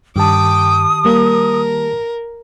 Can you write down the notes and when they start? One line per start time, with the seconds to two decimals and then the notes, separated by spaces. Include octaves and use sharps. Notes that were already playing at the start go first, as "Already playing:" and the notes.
0.16 G2 D#3 G4 G5 A5 D6 D#6
1.05 G3 A#3 A#4